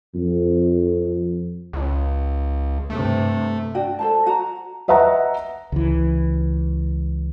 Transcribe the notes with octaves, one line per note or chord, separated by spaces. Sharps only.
F2
C#2
G2 C3 A3
D4 F#4 G5
A4 C5 A5
F#4 A#5
B4 D#5 E5 F#5 A#5
C#2 E3